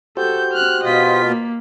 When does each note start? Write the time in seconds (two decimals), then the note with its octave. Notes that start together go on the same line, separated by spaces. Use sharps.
0.17 F#4 G4 A4 C5 G6
0.53 F6 F#6
0.84 B2 F4 D#5 B6
1.27 A#3